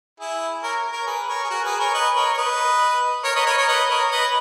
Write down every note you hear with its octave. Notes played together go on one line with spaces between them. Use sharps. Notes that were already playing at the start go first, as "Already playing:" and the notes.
E4 G#4
A#4 C#5
A#4 C#5
G#4 B4
A#4 C#5
G#4
F#4 A#4
G#4 B4
A#4 C#5
B4 D#5
A#4 C#5
C#5
B4 D#5
A#4 C#5
B4 D#5
A#4 C#5
A#4 C#5
B4 D#5
A#4 C#5
B4 D#5